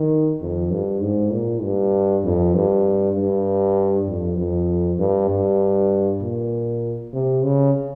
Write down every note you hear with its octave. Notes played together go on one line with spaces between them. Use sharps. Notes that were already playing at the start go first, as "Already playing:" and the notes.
Already playing: D#3
F2
G2
G#2
A#2
G2
F2
G2
G2
F2
F2
G2
G2
A#2
C3
C#3